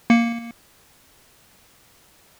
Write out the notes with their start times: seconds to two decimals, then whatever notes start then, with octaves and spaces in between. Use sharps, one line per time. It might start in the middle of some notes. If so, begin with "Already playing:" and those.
0.10 A#3 C#7